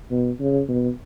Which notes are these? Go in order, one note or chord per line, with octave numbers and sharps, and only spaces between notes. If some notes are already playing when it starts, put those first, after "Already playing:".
B2
C#3
B2